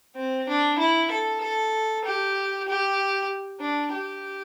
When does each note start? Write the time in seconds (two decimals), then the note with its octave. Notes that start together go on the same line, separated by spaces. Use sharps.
0.16 C4
0.48 D4
0.78 E4
1.11 A4
1.41 A4
2.05 G4
2.68 G4
3.61 D4
3.93 G4